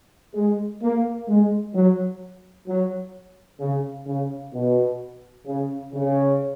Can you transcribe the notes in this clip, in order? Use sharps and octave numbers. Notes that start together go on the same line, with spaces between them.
G#3
A#3
G#3
F#3
F#3
C#3
C#3
B2
C#3
C#3